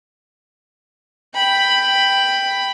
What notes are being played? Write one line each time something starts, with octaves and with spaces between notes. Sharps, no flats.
G5 B5